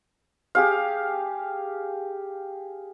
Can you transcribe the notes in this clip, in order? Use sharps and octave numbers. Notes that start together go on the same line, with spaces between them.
G4 G#4 F5